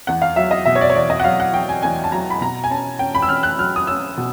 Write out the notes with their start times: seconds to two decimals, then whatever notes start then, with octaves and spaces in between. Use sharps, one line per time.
0.07 E2 F#5
0.22 F5
0.36 F#3 E5
0.51 D#5
0.65 B2 E5
0.75 C#5
0.81 D5
0.90 C#5
0.95 E2 D5
1.10 D#5
1.20 F#5
1.24 F#3 F5
1.40 F#5
1.53 F#3 G5
1.69 G#5
1.83 E2 G#5
2.04 A5
2.12 F#3 A#5
2.30 B5
2.41 B2 A#5
2.64 G#5
2.70 C#4 A5
2.99 C#4 G5
3.15 B5
3.22 E6
3.29 C#4 F6
3.43 F#6
3.59 F#3 F6
3.76 D#6
3.87 C#4 E6
4.17 B2